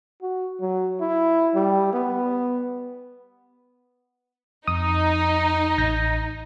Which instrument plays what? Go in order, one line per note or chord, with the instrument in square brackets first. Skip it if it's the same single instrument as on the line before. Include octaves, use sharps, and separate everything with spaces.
[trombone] F#4
F#3
E4
G3
B3
[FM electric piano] F2 D#6 [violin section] D#4
[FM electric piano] A1 G6 A#6